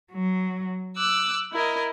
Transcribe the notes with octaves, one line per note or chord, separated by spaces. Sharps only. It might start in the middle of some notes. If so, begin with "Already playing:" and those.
F#3
D6 E6 F#6
E4 A#4 D#5